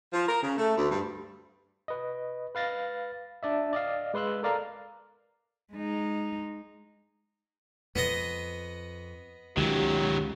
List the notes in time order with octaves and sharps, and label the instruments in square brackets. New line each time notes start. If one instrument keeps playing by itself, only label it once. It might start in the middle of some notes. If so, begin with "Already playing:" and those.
[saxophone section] F3
A#4
C#3
A3
D2
G2
[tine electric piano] B4 D#5
B4 F5 A6 A#6
D4 D5 E5
D5 D#5 F5
G#3 B4 C6 E6 F#6
A4 A#4 D5 F5 A#5
[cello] G#3 D#4
[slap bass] F2 [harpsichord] B3 D#5
[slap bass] C#2 [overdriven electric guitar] D#3 F#3 [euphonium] G4